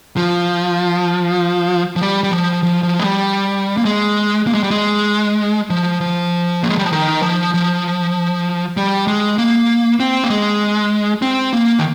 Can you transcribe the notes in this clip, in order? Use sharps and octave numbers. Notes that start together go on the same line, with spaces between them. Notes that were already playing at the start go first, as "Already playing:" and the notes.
F3
F3
G3
G3
F3
F3
F3
G#3
G3
A#3
G#3
A#3
G#3
G3
G#3
F3
F3
A#3
G#3
G3
F3
D#3
F3
F3
G3
G#3
A#3
C4
A#3
G#3
C4
A#3
D#3